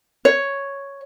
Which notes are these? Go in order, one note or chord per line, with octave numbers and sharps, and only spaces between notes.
C#5